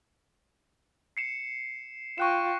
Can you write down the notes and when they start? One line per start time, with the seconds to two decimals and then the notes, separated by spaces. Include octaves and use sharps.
1.17 C7 C#7 E7
2.18 F4 G5 C#6 F#6 E7